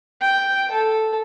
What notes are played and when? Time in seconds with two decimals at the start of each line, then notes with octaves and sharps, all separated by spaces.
0.21 G5
0.71 A4